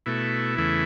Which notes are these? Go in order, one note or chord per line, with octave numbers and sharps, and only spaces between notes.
B2 A3 E4
E2 C#3 E3 A3